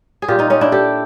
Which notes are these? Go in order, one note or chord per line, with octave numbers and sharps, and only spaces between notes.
G#4
A#2 G3 F4 G4
D#4 F4
C#4 D#4
D4 E4
G4 A4